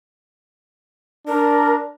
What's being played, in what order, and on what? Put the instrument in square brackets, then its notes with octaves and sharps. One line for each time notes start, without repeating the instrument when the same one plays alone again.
[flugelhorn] D4 [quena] A#4